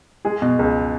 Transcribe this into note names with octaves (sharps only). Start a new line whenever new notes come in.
G#3 G#4
B2
C#2